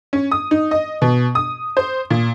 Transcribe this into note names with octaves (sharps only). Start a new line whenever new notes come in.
C#4
D#6
D#4
D#5
B2
D#6
C5
A#2